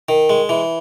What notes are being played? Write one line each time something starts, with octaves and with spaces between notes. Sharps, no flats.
D#3
G#3
E3